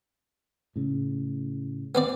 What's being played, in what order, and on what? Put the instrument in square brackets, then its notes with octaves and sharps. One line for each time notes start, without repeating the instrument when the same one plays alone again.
[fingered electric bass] A2 C#3
[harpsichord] B3 C4 D5